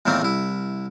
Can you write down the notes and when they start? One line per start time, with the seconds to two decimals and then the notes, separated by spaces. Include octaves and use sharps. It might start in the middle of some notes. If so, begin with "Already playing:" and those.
0.06 E2 A2 D#3 A3 A#3 C4
0.22 C2 E4